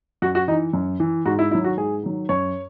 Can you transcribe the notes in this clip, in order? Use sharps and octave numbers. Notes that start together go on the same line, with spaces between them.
F#2 F#4
F#4
E3 D#4
F#2
E3
G#2 F#4
E4
D#3 F#3 E4
F#4
G#2 G#4
D#3 F#3
F#2 C#5